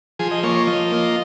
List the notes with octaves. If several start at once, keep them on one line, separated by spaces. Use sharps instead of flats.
F3 G#4
D#5
A#3 F4 C#5
C#5
F3 D#5
A#3 F4